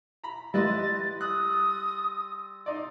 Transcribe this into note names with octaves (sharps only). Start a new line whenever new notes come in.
A#5 B5
G3 E4 B4 D#5 C6 A6 A#6
D#6 E6 F#6 A6
D#4 D5 C6